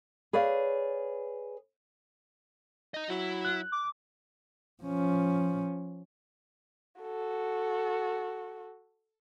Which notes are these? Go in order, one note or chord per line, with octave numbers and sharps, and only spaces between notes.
G#4 B4 C#5 D5 F5
D#4 D#5
F#3 E4
F#6
D6
F3 C#4
F#4 A4